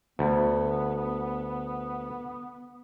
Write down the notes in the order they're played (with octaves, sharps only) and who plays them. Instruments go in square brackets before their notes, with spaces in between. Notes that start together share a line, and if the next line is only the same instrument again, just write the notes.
[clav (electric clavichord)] D2 [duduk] B3